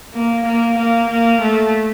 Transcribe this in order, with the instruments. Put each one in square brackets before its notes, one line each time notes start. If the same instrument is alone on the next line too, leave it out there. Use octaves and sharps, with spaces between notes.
[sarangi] A#3
A#3
A#3
A#3
A3